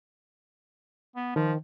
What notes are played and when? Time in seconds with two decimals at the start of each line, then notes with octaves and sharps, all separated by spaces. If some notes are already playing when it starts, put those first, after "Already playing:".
1.16 B3
1.36 D#3 F3